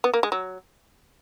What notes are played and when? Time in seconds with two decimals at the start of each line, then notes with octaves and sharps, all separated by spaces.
0.04 B3
0.14 A#3
0.23 G#3
0.32 F#3